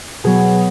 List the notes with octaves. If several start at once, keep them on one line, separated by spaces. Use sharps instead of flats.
B2 F#3 B3 G#4